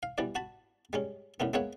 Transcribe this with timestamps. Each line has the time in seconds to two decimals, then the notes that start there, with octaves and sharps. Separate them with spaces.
0.03 F5
0.18 B2 E3 G3 D5
0.35 F#4 A5 B5
0.93 G3 G#3 C#4
1.40 F#2 A2 D3 B3
1.54 G#3 A#3 B3 C#5 E5 F#5